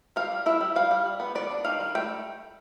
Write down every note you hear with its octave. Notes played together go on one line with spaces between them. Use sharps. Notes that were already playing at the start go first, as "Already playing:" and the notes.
G3 F5
G3
E4 E5
G3
G3 F5
G3
G3
B3
B3 D5
D4
D#3 F5
G3
A3 G5